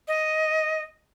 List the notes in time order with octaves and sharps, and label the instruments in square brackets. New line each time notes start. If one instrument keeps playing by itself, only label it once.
[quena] D#5